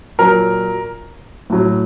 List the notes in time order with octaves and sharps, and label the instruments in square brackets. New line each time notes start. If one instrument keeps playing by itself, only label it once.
[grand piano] A#2 F#3 A#4
A2 F#3